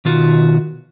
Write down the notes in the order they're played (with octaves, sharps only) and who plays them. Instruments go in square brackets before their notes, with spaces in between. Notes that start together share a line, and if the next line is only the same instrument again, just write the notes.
[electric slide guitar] B2 D#3 F4 F#4